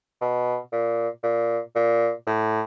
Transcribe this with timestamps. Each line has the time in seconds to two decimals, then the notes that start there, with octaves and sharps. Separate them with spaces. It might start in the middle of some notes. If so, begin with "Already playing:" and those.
0.21 B2
0.73 A#2
1.23 A#2
1.76 A#2
2.27 A2